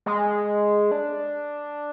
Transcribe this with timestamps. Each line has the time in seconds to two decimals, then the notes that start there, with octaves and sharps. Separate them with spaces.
0.06 G#3
0.91 D4